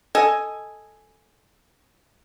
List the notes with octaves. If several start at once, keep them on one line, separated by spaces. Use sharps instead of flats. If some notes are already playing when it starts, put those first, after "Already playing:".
A4 D#5 G#5